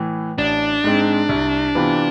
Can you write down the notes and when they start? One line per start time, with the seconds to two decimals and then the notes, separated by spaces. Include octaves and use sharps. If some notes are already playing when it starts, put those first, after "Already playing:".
Already playing: A2 E3
0.38 A1 D4
0.84 G#2 G#3 C4
1.29 C2
1.75 C3 E3 B3 F4